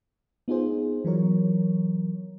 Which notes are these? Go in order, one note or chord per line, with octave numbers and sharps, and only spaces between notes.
B3 D#4 F4 G#4 C5
E3 F#3 A#4 C#5